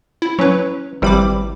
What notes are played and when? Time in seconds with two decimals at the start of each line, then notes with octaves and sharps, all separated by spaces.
0.22 E4
0.39 F#3 C#4 B4 C#5
1.02 G#1 C3 E3 G3 B5 D6